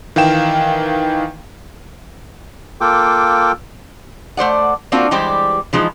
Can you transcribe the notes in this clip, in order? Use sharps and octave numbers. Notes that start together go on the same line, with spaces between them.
D#3 E3 F5 G5 E7
A#3 F4 A4 G5 D6
A3 C5 D5 F#5
A#3 C4 D4 F4 F#4
E3 G3 G#3 G4 C5
E3 F3 G#3 D#4